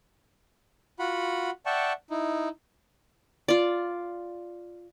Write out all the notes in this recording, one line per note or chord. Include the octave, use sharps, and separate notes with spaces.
F4 F#4 F#5 B5
D5 E5 F#5 G5 A5 C#6
D#4 E4
F4 D5